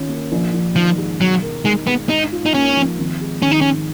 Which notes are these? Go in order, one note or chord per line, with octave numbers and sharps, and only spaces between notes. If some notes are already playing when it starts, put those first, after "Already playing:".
Already playing: D#2 D#3 C#4 F4
A#3
A#1
A#1
D#3 F3
G#2
B2 F#3
A#4
G#3 D#4
G#3 B3
G#2 D#4
F4
D#4
A#3 C#4
F3
G#1
G#3
D#3 C#4
D#4
C#4
G#2